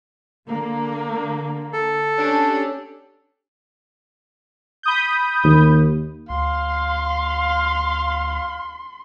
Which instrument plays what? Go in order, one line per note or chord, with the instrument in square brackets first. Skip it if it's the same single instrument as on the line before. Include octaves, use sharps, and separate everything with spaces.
[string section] D3 A#3
[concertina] A4
[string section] C#4 D4 G4
[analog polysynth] B5 D#6 G6
[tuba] D#2
[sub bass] D2 [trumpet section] F5 [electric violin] C6